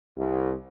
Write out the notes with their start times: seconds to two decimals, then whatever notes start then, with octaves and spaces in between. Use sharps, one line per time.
0.16 C2